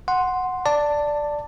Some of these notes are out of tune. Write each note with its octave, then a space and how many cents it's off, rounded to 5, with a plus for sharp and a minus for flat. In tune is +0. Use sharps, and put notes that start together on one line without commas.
F#5 -5 C6 +0
D5 +0 A5 +15